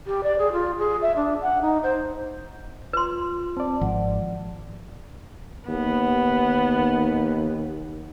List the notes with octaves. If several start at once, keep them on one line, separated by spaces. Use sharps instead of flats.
G4
D5
G#4
F4
G#4
E5
D4
F#5
D#4
C5
F4 B4 C6
C4 D5 A5
G#1 F3 D5 F#5
D#2 B3